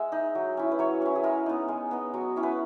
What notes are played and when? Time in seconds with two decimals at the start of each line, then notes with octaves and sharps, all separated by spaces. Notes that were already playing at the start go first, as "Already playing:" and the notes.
Already playing: G#3 E5 F#5
0.12 D#4
0.35 F#3
0.57 C#4 E4
0.71 B4
0.79 F#3 C#5
1.02 C#4 E4
1.16 G#4
1.24 G#3 A#4
1.46 B3 D#4
1.68 G#3
1.91 B3 D#4
2.14 F#3 F#4
2.36 C#4 E4
2.43 B4